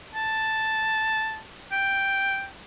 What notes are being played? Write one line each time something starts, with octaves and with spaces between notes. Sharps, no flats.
A5
G5